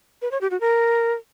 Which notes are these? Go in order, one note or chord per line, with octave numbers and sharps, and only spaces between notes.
B4
C#5
G4
F#4
A#4